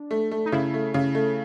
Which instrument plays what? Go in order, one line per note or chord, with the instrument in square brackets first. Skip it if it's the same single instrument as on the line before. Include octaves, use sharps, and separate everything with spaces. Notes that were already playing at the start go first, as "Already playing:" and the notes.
Already playing: [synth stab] D4
[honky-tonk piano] A3
A3
[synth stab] D#4
[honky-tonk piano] C#3 [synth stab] E4
[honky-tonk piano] A3
C#3
A3